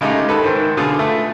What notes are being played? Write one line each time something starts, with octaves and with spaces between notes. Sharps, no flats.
C#3 G#3 A3 D#4 G4
D#3 A4 B4
G#2 D#3 C5
B2 D3 F4 G#4 A4
A3 B3